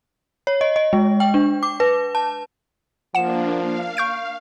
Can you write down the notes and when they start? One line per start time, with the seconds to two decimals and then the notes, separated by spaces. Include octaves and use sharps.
0.47 C#5
0.61 D#5
0.76 D#5
0.93 G#3
1.20 G5
1.34 D4
1.63 D6
1.80 B4
2.15 A5
3.15 F3 A#3 D4 F#5 E7
3.58 F5
3.97 C#6 G6 D7